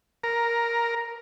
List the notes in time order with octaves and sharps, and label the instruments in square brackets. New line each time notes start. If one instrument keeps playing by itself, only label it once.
[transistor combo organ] A#4